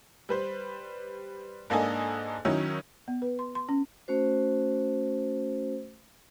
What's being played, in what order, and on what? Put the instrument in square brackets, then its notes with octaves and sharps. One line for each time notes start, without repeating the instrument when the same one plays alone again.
[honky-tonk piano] G3 B4 C5
G#2 A#3 D4 A4 D#5 G#5
D#3 F#3 C#4 D#4 E4
[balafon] B3
B4
C6
C6
C#4
[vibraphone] A3 C#4 F#4 C5